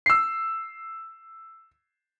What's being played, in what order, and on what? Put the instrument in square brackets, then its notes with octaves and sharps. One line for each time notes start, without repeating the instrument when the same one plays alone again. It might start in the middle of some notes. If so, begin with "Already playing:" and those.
[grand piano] E6 C7